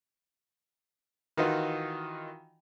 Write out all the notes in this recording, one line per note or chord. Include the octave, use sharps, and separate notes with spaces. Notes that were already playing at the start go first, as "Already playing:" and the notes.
D#3 E3 D#4 F4 F#4